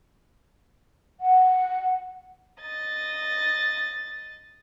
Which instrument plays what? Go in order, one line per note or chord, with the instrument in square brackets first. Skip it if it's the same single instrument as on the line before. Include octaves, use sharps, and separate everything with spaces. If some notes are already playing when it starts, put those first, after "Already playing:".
[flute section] F#5
[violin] D#5 A6